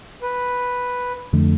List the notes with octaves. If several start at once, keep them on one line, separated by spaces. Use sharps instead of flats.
B4
F2 D3 A3